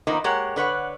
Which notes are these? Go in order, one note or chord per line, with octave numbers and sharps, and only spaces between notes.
D#3 F3 A#3 B3 D#4
G#3 A#3 G4 A#4 C#5 F#5
D3 B4 C#5 F#5